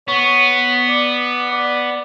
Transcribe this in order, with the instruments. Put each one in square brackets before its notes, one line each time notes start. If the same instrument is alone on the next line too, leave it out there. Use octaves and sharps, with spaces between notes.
[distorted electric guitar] B3 [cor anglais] C#5
[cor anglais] D5
D5